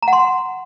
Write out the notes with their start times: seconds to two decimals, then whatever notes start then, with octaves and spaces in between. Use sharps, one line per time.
0.03 A#5
0.08 F#5
0.13 C6